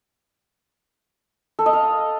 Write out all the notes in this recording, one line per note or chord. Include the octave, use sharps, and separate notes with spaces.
A4
D#5
F5